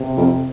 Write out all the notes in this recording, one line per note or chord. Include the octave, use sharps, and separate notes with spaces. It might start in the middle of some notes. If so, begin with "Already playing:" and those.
Already playing: C3
F2